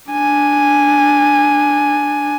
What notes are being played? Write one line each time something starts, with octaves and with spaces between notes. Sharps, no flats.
D4 G#5